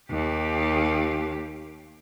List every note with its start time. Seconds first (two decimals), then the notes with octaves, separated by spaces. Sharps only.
0.10 D#2 G4